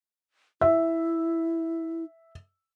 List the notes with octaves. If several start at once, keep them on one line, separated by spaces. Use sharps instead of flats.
E4 E5